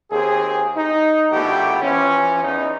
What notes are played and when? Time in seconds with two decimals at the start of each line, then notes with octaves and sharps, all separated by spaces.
0.11 D#2 C4 G#4
0.76 D#4
1.32 A#1 B2 A3 B3 G4
1.82 E3 F3 C#4
2.44 E2 D#4